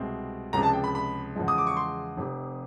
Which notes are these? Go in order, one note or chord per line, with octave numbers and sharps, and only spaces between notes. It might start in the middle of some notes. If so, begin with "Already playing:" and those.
Already playing: C2 B2 G#3 C4
C#2 C3 F3 G#3 A#5
A5
G5
B5
B5
E2 C#3 F3 G#3
D#6
D6
C#6
C6
F1 F2 C3